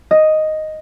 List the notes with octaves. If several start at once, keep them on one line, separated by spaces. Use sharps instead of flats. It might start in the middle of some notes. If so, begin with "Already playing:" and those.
D#5